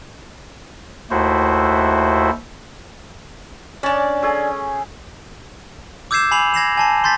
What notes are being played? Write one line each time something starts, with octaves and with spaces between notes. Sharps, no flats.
D#2 A3 E4 F#4 C5
C#4 D4 D5
A3 G#4
D6 E6 G6 G#6 C7 E7
G#5 B5 C7 F7 F#7
G#6 A#6 C7 E7
G#5 A5 C7
C6 G6 A6 B6